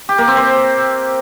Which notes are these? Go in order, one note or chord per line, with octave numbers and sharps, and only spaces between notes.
G4
A#3
C4
C5